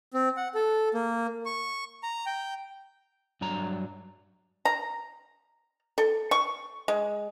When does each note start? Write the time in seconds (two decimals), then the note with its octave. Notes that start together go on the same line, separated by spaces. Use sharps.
0.14 C4
0.37 F#5
0.55 A4
0.94 A#3
1.45 C#6
2.03 A#5
2.26 G5
3.41 G2 F#3 D4 A#5
4.65 A#5
5.98 A4
6.31 C#6
6.88 G#3